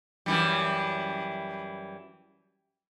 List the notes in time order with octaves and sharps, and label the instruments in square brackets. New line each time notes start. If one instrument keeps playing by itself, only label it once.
[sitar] F#2 E3 G3